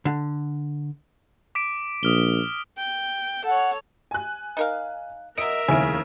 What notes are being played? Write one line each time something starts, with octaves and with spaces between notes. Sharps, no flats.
D3
D6 B6 D7
A#1 D#6 F6 G7
G5
A4 C#5 F#5
G#5 F#6
D#4 A#4 F5
F#3 A#4 D#5 E5 D7
F1 D#2 C#3 E4 G#5 D7